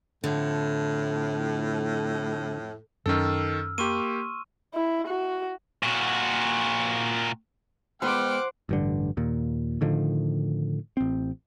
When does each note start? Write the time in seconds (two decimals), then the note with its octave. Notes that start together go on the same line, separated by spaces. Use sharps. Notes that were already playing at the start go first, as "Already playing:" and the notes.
0.24 F2 A2 D3
3.06 F#2 D#3 C#4 A4 E6 F6
3.78 A#3 G4 C6 C#6 D#7
4.74 E4
5.07 F#4
5.83 A#2 F#4
8.02 G#3 B3 B4 C5 F#5 G5 D6 F6
8.69 A1 G2 D3
9.17 D#2 A#2
9.81 A2 D3 D#3 F3
10.97 A1 C4